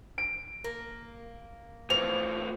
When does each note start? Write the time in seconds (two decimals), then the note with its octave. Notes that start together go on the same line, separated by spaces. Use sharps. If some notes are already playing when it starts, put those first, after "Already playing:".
0.18 D7
0.64 A#3
1.90 A2 E3 F3 C4 F4 F7